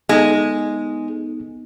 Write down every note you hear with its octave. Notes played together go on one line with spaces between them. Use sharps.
G#3 B3 D#4